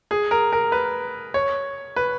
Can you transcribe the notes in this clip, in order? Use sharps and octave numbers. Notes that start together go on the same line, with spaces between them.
G#4
A#4
A#4
B4
C#5
B4